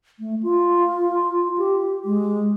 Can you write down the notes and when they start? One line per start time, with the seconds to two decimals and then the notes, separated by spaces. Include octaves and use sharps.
0.19 A3
0.43 F4
1.58 G4
2.05 G#3